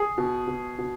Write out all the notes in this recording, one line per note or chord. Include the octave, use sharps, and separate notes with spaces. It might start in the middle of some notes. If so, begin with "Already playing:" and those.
Already playing: G#4
B2
B2
B2